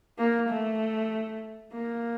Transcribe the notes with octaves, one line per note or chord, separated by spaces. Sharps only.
A#3
A3
A#3